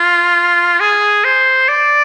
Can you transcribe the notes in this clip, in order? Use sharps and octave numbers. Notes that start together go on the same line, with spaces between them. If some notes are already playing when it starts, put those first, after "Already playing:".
Already playing: F4
G#4
C5
D5